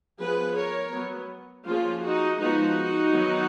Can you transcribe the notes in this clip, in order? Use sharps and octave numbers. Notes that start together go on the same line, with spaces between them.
F3 B3 G#4 B4
A#4 C#5
F#3 B3
F3 A#3 C#4 F4 G#4
D#4 F#4
F3 G#3 B3 D#4 F#4
D#3 F#3 B3